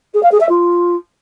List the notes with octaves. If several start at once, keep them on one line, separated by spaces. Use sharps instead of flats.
G#4
F5
G#4
E5
F4